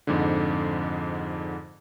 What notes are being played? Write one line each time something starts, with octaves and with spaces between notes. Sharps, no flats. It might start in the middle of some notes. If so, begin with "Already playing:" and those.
F2 G#2 D3